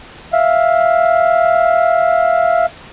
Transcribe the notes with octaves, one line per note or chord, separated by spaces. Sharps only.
E5 F5